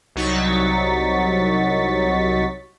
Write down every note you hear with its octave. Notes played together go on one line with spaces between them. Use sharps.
C2 F#3 D#4 C#6 A6 B6